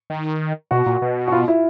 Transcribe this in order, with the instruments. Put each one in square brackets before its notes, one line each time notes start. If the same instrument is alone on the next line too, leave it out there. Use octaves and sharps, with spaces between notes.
[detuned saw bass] D#3
[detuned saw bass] B2 [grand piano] F#4
[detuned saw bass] A#2
B2
[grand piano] F#4
F4
E4